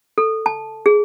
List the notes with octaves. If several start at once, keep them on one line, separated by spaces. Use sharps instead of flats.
A4
A5
G#4